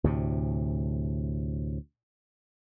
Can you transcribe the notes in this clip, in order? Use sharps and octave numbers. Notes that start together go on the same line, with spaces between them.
D2 A2 C3